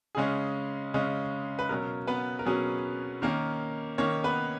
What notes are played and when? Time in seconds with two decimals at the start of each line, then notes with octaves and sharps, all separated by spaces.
0.15 C#3 G#3 C#4 G#4
0.94 C#3 G#3 C#4
1.59 B4
1.69 B2 F#3 C#4 A#4
2.07 B3 B4
2.39 A#4
2.45 B2 F#3 C#4 G#4
3.22 D#3 A#3 C#4 A#4
3.98 D#3 A#3 C#4 C#5
4.24 B3 B4